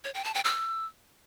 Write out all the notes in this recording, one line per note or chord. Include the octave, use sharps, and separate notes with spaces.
C#5
G5
A5
G5
E6